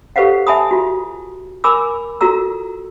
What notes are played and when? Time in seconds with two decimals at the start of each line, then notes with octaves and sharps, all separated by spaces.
0.16 G4 A4 B4 C5 F5 F#5
0.47 E5 G#5 A5 B5 D#6
0.71 F4 F#4
1.64 A#4 G#5 B5 D6 E6
2.21 F4 F#4 A4 A#5 E6